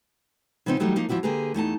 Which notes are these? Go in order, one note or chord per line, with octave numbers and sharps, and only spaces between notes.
C#3 F3 B3 C4 D4 D#4
E3 F#3 G3 A3 D#4
F3 A#3 D#4
E2 F3 F#3 E4 F#4 D5
D3 A#3 G4 G#4 B4 A#5
E2 A3 D#4 A5